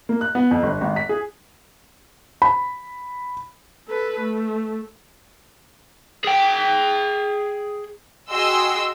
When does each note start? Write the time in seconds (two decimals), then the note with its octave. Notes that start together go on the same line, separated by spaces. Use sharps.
0.09 A#3
0.21 F#6
0.35 B3
0.51 F2
0.63 G1
0.81 G#1
0.96 B6
1.09 G#4
2.42 B5
3.88 A4 B4
4.20 A3
6.24 G#4 G5
8.30 F#4 G#4 D#5 G5 C6 E6